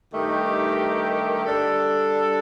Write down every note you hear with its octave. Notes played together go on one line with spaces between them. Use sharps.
G2 D#3 A3 D#4 G4
G3 D4 A4